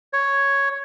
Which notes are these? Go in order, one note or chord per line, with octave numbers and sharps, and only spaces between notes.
C#5